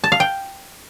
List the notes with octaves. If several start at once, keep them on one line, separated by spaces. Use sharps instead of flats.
A5
F5
G5